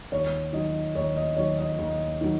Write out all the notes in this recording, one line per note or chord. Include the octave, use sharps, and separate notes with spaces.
D#2 C#5
D#3 F#3 D#5
D#2 C#5
D#5
D#3 F#3 C#5
D#5
D#2
D#3 F#3